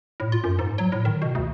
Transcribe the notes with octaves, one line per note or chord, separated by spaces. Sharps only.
A2
F4
F#2
G#2
F#3
A2
D#3
B2
D2